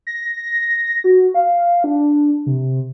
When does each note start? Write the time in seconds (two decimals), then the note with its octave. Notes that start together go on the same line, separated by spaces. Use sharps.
0.07 A#6
1.04 F#4
1.34 F5
1.84 D4
2.46 C3